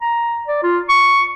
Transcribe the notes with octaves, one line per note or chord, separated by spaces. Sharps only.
A#5
D5
F4
C#6